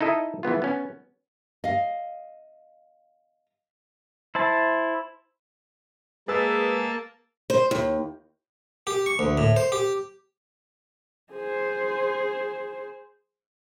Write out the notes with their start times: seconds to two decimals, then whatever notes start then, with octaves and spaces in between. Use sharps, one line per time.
0.01 D#4 E4 A4 D#5
0.43 E3 G#3 B3 F4
0.62 B3 C#4
1.64 D#5 F5
4.35 E4 C5 A5
6.28 G#3 A#3 G#4 B4 A5 E6
7.50 C5
7.71 D#2
8.87 G4
9.06 C#6
9.19 D2
9.37 A2
9.56 C5
9.72 G4
11.32 G#4 C5